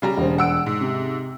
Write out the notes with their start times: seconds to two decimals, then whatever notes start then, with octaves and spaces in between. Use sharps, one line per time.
0.02 C#3 G3 A#5
0.17 E1 C5
0.38 F#5 E6 D7
0.66 G#2
0.81 C3